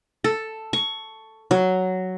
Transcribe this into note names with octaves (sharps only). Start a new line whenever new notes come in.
A4
C#6
F#3